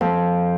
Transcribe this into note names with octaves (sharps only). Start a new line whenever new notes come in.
F2